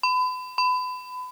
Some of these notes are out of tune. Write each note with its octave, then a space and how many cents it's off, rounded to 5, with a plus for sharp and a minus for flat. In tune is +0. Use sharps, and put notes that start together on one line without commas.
B5 +35
B5 +30